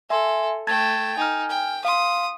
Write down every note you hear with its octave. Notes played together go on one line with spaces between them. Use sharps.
A4 E5 G#5 C6
A3 G5 A5 G#6 A6
D#4 G#5 F6
G5
F5 C6 D#6